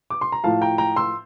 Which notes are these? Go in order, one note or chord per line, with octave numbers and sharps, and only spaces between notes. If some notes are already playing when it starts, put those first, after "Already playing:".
D6
C6
A#5
A2 F3 F5 A5
G5 A#5
G5 A#5
C6 E6